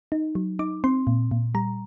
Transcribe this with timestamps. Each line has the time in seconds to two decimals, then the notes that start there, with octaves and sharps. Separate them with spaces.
0.12 D#4
0.35 F#3
0.59 D#4 D6
0.84 C4 C6
1.07 A#2
1.31 A#2
1.55 G3 A#5